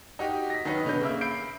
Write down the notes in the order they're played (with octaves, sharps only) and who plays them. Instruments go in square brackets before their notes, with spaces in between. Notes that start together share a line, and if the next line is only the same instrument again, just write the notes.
[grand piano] D#4 F#4 G4
A#6 B6
D#3 F#3 D#4 B4
B2 D3 C#4 B4 G6
C#3 A#3 E5
E5 B5 G6 C7 D7